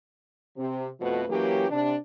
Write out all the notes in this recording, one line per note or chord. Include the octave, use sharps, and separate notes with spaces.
C3
F2 B2 F3 A3 F#4 B4
E3 F#3 A#3 C#4 G4
C3 D4